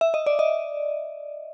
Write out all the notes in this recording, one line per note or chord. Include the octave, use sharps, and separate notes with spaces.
E5
D#5
D5
D#5